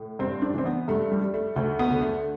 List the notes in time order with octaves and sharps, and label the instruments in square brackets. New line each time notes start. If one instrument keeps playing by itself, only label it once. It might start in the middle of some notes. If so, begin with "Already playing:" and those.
Already playing: [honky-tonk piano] A2
G2 C4
D4
E3 C4
B3
G2 A3
G3
G3
A3
D2 A3
B3
D3
A3